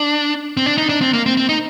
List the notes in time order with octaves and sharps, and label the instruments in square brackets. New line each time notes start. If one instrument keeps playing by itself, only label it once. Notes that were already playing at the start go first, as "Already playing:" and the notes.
Already playing: [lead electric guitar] D4
C4
D4
D#4
D4
C4
A#3
C4
C4
D#4